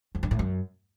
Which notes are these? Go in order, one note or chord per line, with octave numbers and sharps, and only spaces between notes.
F2
G2
A2
F#2